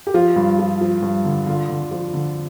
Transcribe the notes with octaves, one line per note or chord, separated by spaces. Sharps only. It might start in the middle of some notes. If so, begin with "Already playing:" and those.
G4
F3 F4
G2
F3
F3
G2
D3
D3 F4
D3
F3
D3